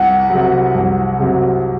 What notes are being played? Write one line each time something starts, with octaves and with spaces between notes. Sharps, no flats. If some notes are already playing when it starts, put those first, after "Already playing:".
Already playing: C2 F#5
C3 F#3
C2
C3 F#3